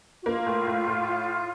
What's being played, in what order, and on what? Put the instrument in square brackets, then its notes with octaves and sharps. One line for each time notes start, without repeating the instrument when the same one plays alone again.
[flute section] F#4
[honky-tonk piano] A#3 [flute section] F4
[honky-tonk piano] A2
A2
A2